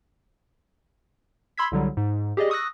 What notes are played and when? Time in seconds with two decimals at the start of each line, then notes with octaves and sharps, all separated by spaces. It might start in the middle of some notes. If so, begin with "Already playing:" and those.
1.58 B5 C6 E6 G#6 B6
1.72 C2 D3 F#3 G3
1.97 G#2
2.37 G4 G#4 D5 D#5
2.50 C#6 D#6 E6 F#6 A#6